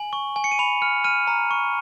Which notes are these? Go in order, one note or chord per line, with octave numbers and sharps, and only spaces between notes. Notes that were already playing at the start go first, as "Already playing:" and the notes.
Already playing: G#5 F#7
C#6
G#5
C#7
D#7
B5 F7
F6 C#7
F6 D#7
A#5
C#6